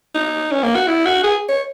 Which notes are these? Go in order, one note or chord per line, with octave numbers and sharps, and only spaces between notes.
D#4
C#4
A#3
F#4
E4
F#4
G#4
C#5